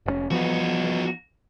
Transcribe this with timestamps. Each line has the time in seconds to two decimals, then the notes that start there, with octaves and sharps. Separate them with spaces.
0.06 F1 B2 C#4
0.31 E3 F3 B3 D#4 F#4